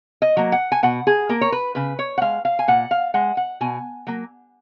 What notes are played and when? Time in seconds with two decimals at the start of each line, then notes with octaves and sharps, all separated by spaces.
0.22 D#5
0.37 F#3 A#3
0.52 F#5
0.72 G#5
0.83 B2 F#5
1.07 G#4
1.29 A#3 A#4
1.41 C#5
1.52 B4
1.75 C#3 B4
1.99 C#5
2.18 F#5
2.21 G#3 F5
2.45 F5
2.59 G#5
2.68 A#2 F#5
2.91 F5
3.14 G#3 F#5
3.37 F#5
3.61 B2 G#5
4.07 F#3 A#3